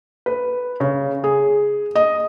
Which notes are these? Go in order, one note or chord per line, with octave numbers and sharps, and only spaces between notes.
B4
C#3
G#4
D#5